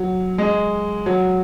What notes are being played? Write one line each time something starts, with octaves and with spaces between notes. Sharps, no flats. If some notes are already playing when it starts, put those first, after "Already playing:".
Already playing: F#3
G#3
F#3